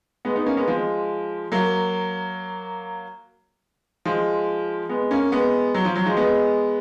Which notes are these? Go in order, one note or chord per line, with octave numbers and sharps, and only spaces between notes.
G#3 B3
B3 D#4
A#3 C#4
G#3 B3
F3 G#3
F#3 A#3
F3 G#3
G#3 B3
A#3 C#4
G#3 B3
F#3
F3
F#3
F3 G#3
G#3 B3